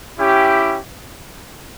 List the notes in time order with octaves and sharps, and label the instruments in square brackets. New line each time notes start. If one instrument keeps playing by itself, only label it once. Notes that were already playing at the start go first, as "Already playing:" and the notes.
[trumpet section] C#4 E4 G4